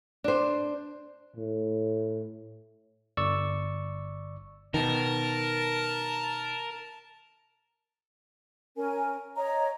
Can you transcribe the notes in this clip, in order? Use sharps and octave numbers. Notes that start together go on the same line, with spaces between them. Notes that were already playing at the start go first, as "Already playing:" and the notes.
D4 C5
A2
G1 D5 C#6 E6
B2 D#3 A#4 A5
C#4 A#4 G#5
C#5 D#5 A#5